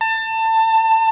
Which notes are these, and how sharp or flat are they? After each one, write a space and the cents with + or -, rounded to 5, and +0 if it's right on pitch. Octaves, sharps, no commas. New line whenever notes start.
A5 +25